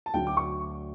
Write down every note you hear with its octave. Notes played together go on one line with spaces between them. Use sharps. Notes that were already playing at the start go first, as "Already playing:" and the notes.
A5
D2 D3 F#3 A3 D4 G5
D6
C#6